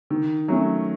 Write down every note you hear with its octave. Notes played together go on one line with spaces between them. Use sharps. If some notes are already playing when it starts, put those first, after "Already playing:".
D#3
F#3 A3 C#4